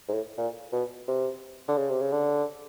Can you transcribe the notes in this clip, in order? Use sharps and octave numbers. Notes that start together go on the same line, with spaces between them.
G#2
A2
A#2
B2
C3
D3
C#3
C3
C#3
D3